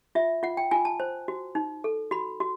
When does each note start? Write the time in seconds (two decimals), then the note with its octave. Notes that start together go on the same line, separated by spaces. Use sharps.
0.15 F4 E5
0.43 F4 F#5
0.57 G5
0.71 F4 G#5
0.85 A5
1.00 C5
1.28 F#4
1.55 D#4
1.84 A4
2.11 F#4 B5
2.40 F#4